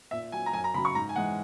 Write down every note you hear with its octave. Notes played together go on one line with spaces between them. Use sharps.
A#2 E5
F#3 G#5
A#5
F#2 G#5
A#5
C#3 F#3 B5
C#6
G#2 A#5
G#5
E3 G#3 F#5